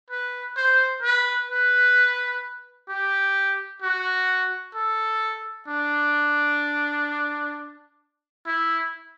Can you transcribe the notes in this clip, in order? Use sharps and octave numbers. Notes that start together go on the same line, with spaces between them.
B4
C5
B4
B4
G4
F#4
A4
D4
E4